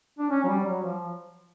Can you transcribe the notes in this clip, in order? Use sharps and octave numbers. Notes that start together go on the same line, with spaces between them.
D4
C#4
F#3
G3
F#3
F3